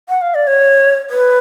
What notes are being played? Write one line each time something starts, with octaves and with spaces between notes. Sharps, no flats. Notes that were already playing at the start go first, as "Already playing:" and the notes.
F#5
F5
D5
C#5
B4